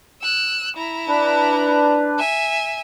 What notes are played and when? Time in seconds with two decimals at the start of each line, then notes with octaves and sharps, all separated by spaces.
0.22 E6 F#6
0.76 E4 A#5
1.08 D4 B4
2.19 E5 G#5